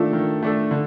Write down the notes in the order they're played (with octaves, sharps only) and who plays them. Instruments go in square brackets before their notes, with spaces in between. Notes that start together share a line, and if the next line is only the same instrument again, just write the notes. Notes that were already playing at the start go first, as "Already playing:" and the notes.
Already playing: [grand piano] D#3 A3 D4 A4 [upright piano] F4
[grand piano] D#3
A3 D4 A4
D3